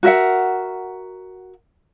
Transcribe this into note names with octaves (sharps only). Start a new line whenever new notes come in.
F#4 A#4 E5 F#5